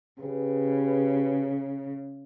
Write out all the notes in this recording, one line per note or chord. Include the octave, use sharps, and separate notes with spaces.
C#3 G4 G#4 B4